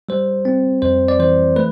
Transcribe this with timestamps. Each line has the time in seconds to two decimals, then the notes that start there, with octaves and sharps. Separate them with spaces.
0.09 G3 C5
0.45 C4
0.82 F2 C5
1.08 D5
1.19 E3 C5
1.56 A3 B4